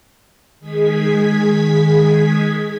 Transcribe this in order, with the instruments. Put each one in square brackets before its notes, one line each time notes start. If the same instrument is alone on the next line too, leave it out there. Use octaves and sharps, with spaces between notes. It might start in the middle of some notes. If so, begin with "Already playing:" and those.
[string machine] D#3 G#3 G#4 G#6 B6